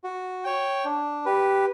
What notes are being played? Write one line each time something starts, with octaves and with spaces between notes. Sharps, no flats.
F#4
C#5 G5
D4
G4 B4